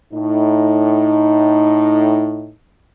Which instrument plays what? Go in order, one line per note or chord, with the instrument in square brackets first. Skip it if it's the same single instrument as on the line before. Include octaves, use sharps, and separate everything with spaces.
[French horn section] A2 D#4